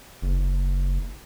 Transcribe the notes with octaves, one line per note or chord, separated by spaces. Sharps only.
F#1